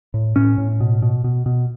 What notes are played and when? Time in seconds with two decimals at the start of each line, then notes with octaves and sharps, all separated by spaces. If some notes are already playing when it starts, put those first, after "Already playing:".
0.14 A2
0.36 A2 C#4
0.58 A2
0.80 B2
1.02 B2
1.24 B2
1.46 B2